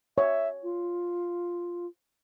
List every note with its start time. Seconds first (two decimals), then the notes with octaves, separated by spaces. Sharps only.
0.18 C#5 E5
0.63 F4